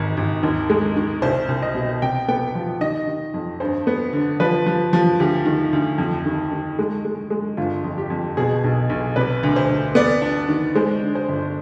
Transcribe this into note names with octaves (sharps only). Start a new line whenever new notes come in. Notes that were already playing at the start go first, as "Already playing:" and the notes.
Already playing: G#1 G#2
G#1
D#2
G#3
D#3
C2 C5
C2
D#5
B2
C3 G5
B3 G5
F3 G5
D#3 D#5
D#3
F2
G2 C5
B3
D3
F3 B4
F3
F3
D2 G4
D#3
D2
F2
D#3
D#3
G#3
G#3
G#3
G1 F4
F2
G4
F2
B2 G#4
B1
B1
C3 B4
D2
C5
D2
B3 D5
D4
D#3
G#3 C5
D3
C5
G1